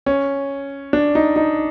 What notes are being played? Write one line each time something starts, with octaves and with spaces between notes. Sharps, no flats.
C#4
D4
D#4
D#4